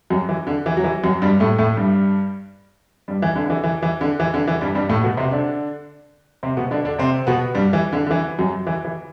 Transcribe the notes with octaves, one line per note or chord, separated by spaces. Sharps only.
F#2 F#3
E3
D3
E3
F#3
E3
F#2 F#3
G2 G3
A2 A3
A2 A3
G2 G3
G2 G3
E3
D3
D3
E3
E3
E3
D3
E3
D3
E3
G2 G3
G2 G3
A2 A3
B2 B3
C3 C4
D3 D4
C3 C4
B2 B3
D3 D4
D3 D4
C3 C4
B2 B3
G2 G3
E3
D3
D3
E3
F#2 F#3
E3
E3